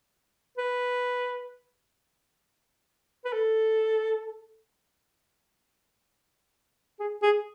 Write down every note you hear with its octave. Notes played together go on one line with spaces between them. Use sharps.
B4
B4
A4
G#4
G#4